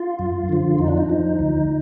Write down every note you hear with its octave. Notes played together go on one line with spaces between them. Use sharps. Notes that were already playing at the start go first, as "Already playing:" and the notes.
Already playing: F4
F#2
D3 F3
F2 D#4
D4
D#4
F3
D2